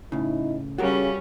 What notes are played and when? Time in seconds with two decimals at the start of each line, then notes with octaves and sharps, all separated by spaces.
0.12 A2 C#3 D#4 E4
0.78 C#3 G3 C#4 F#4 G4 A#4